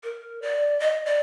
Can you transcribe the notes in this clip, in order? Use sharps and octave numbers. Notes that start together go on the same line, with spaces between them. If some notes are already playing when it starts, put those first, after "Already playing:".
A#4
D5
D#5
D5